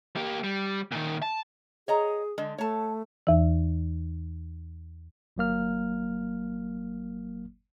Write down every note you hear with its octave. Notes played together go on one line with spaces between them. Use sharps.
A#3 G4
G3
A#2 D#3
A5
G#4 C#5 D#5 A#5
D3 G#3
A3 C#5 A5
E2 E3
G1 F#3 A#3 F6